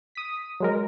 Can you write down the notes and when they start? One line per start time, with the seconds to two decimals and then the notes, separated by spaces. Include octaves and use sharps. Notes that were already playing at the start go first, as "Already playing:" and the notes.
0.15 D#6 B6
0.60 F#3 G#3 A#4